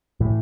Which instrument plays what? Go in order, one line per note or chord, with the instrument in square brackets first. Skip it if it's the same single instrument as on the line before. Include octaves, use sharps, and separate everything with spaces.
[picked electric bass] A2 E3